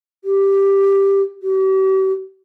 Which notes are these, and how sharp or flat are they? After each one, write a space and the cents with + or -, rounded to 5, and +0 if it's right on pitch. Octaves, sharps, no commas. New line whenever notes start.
G4 +5
G4 -45